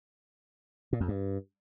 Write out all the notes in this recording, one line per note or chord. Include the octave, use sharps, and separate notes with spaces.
A#2
F2
G2